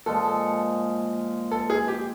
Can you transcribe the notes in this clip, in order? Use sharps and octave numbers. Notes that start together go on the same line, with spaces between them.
A#2 F3 G#3 A4
A4
G#4
G4